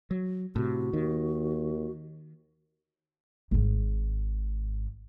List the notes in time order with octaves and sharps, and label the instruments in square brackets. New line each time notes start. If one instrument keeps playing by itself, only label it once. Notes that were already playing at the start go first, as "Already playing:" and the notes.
[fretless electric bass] F#3
[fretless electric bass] A2 C3 [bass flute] F#4
[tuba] D#2 [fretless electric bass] D#3
[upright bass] G#1 G#2